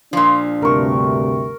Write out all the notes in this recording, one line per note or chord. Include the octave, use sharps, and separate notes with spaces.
A#2 F3 D4
D2 G2 C3 A#4 C#6